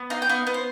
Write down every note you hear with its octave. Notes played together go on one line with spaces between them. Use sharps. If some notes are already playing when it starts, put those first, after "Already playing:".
Already playing: B3
D#4 F5
G5
B3 F5
B3
C5